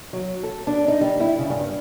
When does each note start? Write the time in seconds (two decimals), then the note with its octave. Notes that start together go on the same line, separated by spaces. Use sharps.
0.13 F#3
0.43 A4
0.67 D4
0.88 D#4
1.01 G3
1.20 E4
1.39 C#3
1.50 G2